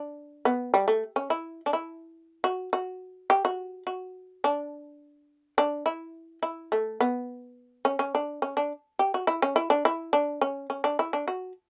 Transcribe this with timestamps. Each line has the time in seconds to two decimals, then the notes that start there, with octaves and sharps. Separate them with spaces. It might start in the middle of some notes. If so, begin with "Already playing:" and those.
Already playing: D4
0.45 B3
0.74 G3
0.88 A3
1.16 C#4
1.30 E4
1.66 D4
1.73 E4
2.44 F#4
2.73 F#4
3.30 G4
3.45 F#4
3.87 F#4
4.44 D4
5.58 D4
5.86 E4
6.43 E4
6.72 A3
7.00 B3
7.85 C#4
7.99 C#4
8.15 D4
8.42 C#4
8.57 D4
8.99 G4
9.14 F#4
9.27 E4
9.42 C#4
9.56 E4
9.70 D4
9.85 E4
10.13 D4
10.41 C#4
10.70 C#4
10.84 D4
10.99 E4
11.13 D4
11.28 F#4